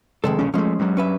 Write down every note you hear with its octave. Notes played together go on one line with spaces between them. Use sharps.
F1 D#3 G#3 A4
A#1 C#3 C#4
F3 G#3 A3 C#4
G2 F#3
C#4 B4 E5